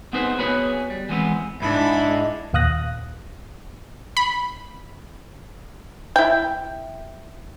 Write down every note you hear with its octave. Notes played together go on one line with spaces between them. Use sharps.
B3 C4 D#4 G#4 B4 C5
B3 F#4 G#4 B4 C#5
G3
E3 G#3 B3 C4
G#2 D4 E4 B5
D#2 A#2 F5 D#6 F#6 A#6
B5
E4 G5